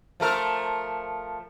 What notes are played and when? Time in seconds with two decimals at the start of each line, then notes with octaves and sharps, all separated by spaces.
0.20 F3 A3 A#4